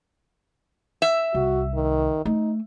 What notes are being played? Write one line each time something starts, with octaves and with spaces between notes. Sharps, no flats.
E5
C2 F#4
D#3
A3 D#4